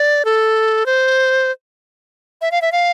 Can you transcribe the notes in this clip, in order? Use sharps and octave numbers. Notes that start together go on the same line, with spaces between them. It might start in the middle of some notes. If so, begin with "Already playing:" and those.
Already playing: D5
A4
C5
E5
F5
E5
F5